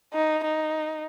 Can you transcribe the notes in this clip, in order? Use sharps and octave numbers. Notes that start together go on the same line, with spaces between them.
D#4
D#4